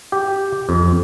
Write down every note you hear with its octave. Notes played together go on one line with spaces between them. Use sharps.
G4
F2